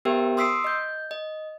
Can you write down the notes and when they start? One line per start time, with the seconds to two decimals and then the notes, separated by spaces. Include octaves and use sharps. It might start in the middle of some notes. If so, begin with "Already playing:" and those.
0.05 B3 G4 A#4 C5 E5 G5
0.37 C6 D#6 E6 B6 C7 D7
0.64 D#5 G6
1.11 D#5